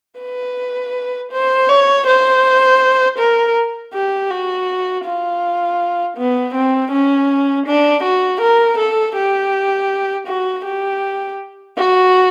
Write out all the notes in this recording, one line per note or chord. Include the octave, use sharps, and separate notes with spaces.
B4
C5
C#5
C5
A#4
G4
F#4
F4
B3
C4
C#4
D4
F#4
A#4
A4
G4
F#4
G4
F#4